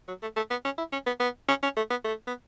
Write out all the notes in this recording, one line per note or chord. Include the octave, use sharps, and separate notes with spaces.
F#3
A3
A3
B3
C#4
E4
C#4
B3
B3
C#4
C#4
A3
B3
A3
B3